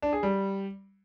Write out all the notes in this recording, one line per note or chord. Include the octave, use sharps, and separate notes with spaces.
D4
G#4
G3